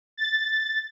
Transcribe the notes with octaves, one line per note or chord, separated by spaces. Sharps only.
A6